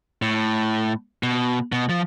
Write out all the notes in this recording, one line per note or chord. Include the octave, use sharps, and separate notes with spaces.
A2
B2
B2
F3